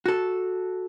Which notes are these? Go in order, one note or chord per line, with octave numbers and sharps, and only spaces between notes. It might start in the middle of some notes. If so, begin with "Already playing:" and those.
F#4 A4